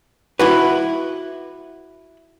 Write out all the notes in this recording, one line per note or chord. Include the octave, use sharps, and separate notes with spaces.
E4 F#4 B4